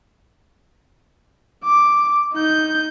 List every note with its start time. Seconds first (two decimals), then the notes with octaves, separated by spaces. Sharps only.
1.64 D6
2.34 D#4 G6